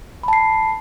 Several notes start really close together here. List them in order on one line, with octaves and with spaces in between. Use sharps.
B5 A5 C7